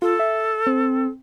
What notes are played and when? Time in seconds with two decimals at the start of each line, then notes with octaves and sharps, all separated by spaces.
0.02 F4 A4
0.20 E5
0.67 C4